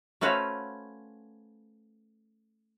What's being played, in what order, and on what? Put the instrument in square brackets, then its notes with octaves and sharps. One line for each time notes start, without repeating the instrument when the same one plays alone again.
[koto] A3 C#4 F#4 B4 C5 F5